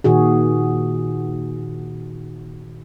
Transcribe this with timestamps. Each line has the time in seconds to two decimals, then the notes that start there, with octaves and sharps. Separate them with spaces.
0.04 A#2 D#3 F#4 G#4